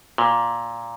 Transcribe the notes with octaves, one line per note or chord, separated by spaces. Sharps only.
A#2